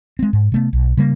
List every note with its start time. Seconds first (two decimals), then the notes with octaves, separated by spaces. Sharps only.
0.19 G#3 C4
0.33 G#2
0.52 C3 A3 B3
0.73 B1
0.97 C#3 G3 A#3